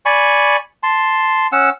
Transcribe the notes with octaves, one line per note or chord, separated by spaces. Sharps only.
D5 G#5 B5 C#6
A5 C6
C#4 F#5 E6